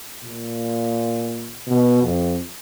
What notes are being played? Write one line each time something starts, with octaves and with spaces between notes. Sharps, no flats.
A#2
B2
F2